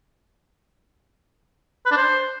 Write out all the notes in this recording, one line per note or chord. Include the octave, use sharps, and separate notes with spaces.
B4
D4
C5